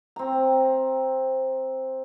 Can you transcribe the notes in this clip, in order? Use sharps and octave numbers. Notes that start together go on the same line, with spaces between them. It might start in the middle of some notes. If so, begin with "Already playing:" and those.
C4 A#5